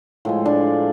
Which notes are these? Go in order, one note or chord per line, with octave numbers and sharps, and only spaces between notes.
A2 F3 G#3
D4 D5